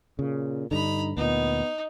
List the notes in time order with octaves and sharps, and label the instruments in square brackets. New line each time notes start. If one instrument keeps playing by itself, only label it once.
[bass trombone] A#2 [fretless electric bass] C#3
[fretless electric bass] G2 D3 [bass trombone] D#4 [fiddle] A#5 B5
[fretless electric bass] D2 A#2 [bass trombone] B3 [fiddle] D#4